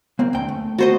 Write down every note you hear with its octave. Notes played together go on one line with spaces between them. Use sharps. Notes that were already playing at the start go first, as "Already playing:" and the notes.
A#3 C4
D2 G5
A3
F#4 C5 D#5